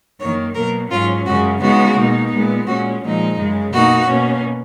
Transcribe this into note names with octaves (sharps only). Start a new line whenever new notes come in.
F#2 D#3 A#3 C#5
B2 F#3 A#3 A#4
G#2 F#3 C#4 F4
F#2 C#3 G#3 C#4 F#4
C#3 G#3 B3 D#4 F#4
B2 A#3 D#4
A#2 G#3 B3
A#2 G#3 C#4 F#4
A#2 F3 G#3 D#4
F#2 C#3 G#3
B2 A#3 D#4 F#4
B2 A#3 C#4